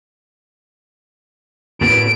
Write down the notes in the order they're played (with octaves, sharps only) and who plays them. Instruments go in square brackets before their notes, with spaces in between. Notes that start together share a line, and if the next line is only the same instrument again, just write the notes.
[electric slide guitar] A2 A3 B3 [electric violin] D7